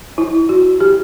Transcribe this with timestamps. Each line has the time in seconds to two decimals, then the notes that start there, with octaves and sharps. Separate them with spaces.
0.18 E4
0.49 F#4
0.80 G4